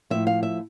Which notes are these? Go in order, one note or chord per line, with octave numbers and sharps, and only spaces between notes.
A2 F3 E5
F5
E5